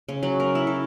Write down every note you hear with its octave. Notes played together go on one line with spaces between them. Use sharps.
C#3
F#3
A#4
E4
A4